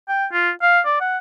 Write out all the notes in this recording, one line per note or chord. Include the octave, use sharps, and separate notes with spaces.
G5
F4
F5
D5
F#5